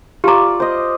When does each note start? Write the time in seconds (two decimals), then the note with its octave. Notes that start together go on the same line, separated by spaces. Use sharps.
0.24 F4 G4 D5 A#5
0.60 C5 D#5